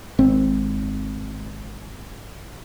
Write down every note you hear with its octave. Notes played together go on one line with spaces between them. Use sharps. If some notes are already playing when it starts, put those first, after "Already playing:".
G#1 C4